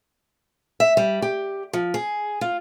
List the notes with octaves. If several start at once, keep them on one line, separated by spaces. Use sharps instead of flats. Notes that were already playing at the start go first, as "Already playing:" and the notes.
E5
G3
G4
F3
G#4
F4